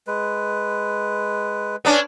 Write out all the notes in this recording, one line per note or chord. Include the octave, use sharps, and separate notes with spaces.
G#3 B4
B3 C#4 D4